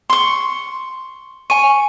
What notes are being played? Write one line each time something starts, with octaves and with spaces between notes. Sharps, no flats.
C6 C#6
G#5 C#6 D#7